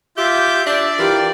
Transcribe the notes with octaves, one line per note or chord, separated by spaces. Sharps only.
F4 G4 E5 D6 G6
D4 D5 E5
E3 F4 G4 A#4